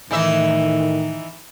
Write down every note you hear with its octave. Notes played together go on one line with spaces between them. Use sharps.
A2 D#3 E3 D#4 E5